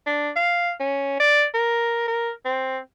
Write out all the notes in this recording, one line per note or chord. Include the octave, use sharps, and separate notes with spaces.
D4
F5
C#4
D5
A#4
A#4
C4